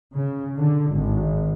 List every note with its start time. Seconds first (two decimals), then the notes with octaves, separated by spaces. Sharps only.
0.14 C#3
0.59 D3
0.93 G#1